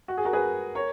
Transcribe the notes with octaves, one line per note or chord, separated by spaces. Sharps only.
F#4
G#4
F#4 A#4
G#4 B4
A#4 C#5